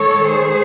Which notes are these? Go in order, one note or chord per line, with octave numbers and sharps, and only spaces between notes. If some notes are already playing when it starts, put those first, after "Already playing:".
Already playing: D#3 G#3 A4 C#5
G#4 C5